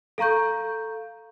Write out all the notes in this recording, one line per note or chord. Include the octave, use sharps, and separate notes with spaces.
A4 F5 A#5 C#6 G6